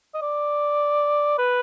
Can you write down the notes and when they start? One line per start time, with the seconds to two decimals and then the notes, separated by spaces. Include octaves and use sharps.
0.14 D#5
0.22 D5
1.38 B4